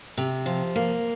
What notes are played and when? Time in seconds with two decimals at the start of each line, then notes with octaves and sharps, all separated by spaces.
0.17 C3
0.46 F3
0.76 A#3